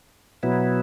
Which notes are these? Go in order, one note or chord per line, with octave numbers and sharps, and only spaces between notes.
B2 F#3 B3 E4